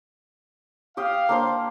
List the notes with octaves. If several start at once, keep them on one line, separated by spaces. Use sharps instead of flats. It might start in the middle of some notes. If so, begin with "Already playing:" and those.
G4 F5 G5 D#6
A#3 D4 C5